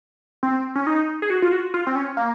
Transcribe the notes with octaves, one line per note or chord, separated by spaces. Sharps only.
C4
C#4
D#4
G#4
F#4
F4
F#4
F4
C4
C#4
A#3